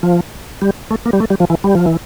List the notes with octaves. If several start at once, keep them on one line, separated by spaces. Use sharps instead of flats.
F3
G3
A3
A#3
G3
A3
G3
F3
E3
G3
F3
E3